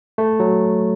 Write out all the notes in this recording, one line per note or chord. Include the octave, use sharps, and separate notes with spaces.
A3
F#3